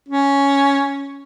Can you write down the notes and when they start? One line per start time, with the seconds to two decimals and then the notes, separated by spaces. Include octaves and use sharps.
0.09 C#4